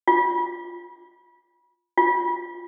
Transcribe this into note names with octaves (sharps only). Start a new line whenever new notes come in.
F4
F4